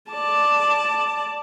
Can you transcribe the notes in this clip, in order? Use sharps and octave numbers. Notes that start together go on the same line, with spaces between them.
D5 A5